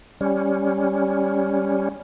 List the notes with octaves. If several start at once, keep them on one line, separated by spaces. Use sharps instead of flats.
G3 C#4